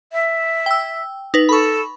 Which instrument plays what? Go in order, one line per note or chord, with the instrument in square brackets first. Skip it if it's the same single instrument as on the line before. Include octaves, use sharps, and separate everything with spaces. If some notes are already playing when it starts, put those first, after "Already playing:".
[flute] E5
[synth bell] G5 E6
D#4 B4
[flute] A4 [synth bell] B5 C#6